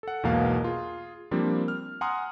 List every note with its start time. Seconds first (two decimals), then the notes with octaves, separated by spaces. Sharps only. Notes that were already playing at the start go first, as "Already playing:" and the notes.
0.03 A4 F#5
0.23 B1 E2 G#2 B2 A#3 F5
0.64 F4 G#4
1.31 F3 G3 A#3 C4 D4
1.68 F6
2.01 F#5 G#5 A#5 C6 D#6 F6